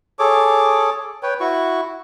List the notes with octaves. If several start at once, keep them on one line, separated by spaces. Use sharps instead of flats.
G#4 A4 C#5 D6
B4 C#5 G5
E4 F#4 C#6